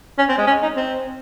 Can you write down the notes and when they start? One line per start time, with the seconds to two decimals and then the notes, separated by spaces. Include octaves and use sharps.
0.18 C#4
0.29 C4
0.38 G#3
0.47 C#4
0.63 D#4
0.77 C4